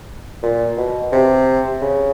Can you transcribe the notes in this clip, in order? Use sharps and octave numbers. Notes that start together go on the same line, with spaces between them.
A#2
B2
C3
C#3